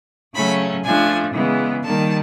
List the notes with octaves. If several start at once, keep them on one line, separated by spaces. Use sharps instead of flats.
C#3 F#3 A3 C#4 B5
F3 A3 D4 G#5
C#3 E3 G#3 B3
D#3 G3 A#3 A5